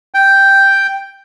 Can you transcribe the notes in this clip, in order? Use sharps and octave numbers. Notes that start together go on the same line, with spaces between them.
G5